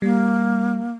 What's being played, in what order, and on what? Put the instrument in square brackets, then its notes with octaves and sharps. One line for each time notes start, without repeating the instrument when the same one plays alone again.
[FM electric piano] G3 [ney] A#3